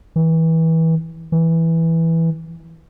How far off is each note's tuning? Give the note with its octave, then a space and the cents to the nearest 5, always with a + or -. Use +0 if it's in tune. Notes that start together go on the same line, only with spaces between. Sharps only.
E3 -25
E3 -5